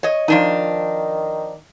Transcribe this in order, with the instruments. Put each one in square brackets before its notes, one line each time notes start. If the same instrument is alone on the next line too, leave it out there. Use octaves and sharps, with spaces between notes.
[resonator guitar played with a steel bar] C#5 D#5
[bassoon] D#3 [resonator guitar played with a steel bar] F3 D4 D#4